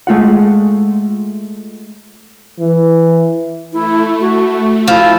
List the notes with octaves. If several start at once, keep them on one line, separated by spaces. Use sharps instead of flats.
G#3 A3 F4 F#5
E3
A3 E4
F#4
F3 E4